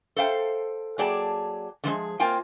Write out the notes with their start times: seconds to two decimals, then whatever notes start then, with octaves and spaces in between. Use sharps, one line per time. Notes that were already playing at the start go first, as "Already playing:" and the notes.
0.16 A4 C5 F5 G5
0.98 F#3 A#3 G#4 D5 G5 A5
1.84 D3 F3 G#3 G#4
2.20 A#3 C4 F4 G5 G#5